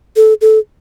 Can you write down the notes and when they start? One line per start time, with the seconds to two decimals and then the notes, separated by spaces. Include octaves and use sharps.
0.16 A4
0.41 A4